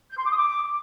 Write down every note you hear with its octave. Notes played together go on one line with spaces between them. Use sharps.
G6
C6
D6
D#6
D6